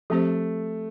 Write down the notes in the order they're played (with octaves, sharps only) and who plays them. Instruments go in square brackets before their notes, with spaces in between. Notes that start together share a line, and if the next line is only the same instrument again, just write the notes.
[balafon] F3 C4 G4 C5 [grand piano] A3